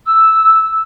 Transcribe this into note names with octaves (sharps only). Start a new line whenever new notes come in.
E6